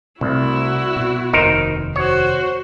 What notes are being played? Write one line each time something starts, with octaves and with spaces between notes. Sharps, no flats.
C2 C3 A3 E4 F#4
B2
F1 D#2 D#4 A#4 C5
F#4 C5 C#5